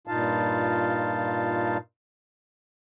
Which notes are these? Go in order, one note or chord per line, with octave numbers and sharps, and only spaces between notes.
G2 A#2 D#4 F4 F5 A5